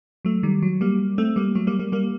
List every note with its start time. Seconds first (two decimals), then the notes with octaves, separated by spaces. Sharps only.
0.25 F#3 A3
0.43 D#3 G3
0.62 F#3
0.81 G3 A#3
1.18 A3 C4
1.36 G3 A#3
1.55 F#3 A3
1.67 G3 A#3
1.79 G3 A#3
1.92 G3 A#3